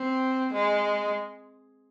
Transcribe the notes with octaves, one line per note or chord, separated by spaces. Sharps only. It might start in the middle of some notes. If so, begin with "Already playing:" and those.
Already playing: C4
G#3